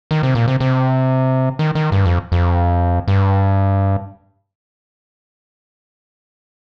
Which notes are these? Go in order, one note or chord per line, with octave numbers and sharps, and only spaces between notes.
D#3
C3
A#2
C3
C3
D#3
D#3
G2
F2
F2
G2